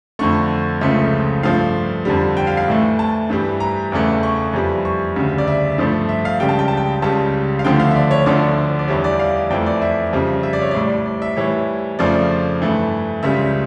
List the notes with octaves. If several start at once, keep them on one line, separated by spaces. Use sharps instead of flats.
F2 D3 A3 C#6
C#2 C#3 F3 A3 E5
G2 F3 A3 F5
F2 D3 G3
G5
F5
F5
A2 E3 A3
A5
G2 E3 G3
A#5
E2 C#3 E3 A3
C#6
F2 E3 G3
C#6
D2 C#3 G3
D5
E5
G2 F3 A3
E5
F5
C#2 C#3 G3 G5
A5
G5
A5
G5
C#2 C#3 G3 A5
F5
D2 D3 F3 A3 G5
F5
E5
D5
C#5
D2 D3 F3 A3 D5
D5
E2 E3 G3 C#5
D5
F5
F2 E3 A3 G5
D5
E5
F2 C#3 G3
E5
D5
C#5
A2 G3 D5
D5
E5
A2 E3 G3 C#5
F2 C#3 F3 A3 D5
G2 E3 A3
C#2 C#3 G3 E5